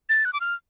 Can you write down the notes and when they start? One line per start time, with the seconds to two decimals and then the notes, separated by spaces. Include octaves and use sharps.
0.09 A6
0.25 F#6
0.33 D6
0.41 F6